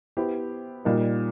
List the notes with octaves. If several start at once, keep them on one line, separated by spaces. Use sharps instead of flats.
B3 E4 G4 C5
A#2 G3 A#3 D#4